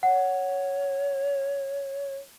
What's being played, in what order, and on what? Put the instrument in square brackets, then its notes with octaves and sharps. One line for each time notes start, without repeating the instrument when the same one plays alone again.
[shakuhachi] C#5 [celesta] F#5